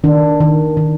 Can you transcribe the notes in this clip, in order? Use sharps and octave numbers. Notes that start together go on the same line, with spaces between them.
D#3 D4
D#3
D#3